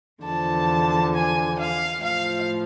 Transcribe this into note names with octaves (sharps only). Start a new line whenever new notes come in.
E2 D3 F3 A5
G#5
F5
A2 F3 F5